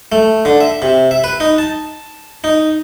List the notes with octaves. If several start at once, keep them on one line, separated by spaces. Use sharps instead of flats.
A3
D3
E5
C3
E5
B4
D#4
A5
D#4